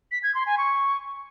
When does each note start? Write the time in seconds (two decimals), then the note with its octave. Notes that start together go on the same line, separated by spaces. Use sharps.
0.12 B6
0.23 G#6
0.35 C6
0.46 G#5
0.58 C#6